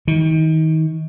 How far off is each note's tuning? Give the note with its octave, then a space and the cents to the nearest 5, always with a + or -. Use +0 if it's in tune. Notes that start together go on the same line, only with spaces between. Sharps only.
D#3 +30